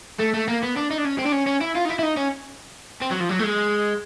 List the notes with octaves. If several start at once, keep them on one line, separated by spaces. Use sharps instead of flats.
A3
A3
A#3
B3
D4
D#4
D4
C#4
C4
D4
C#4
C#4
E4
F4
D#4
E4
E4
D#4
C#4
C4
F#3
F3
F#3
A3
G#3